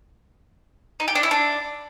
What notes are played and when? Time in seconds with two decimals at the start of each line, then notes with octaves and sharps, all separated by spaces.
1.00 D#4
1.08 G4
1.15 D4
1.23 E4
1.31 D4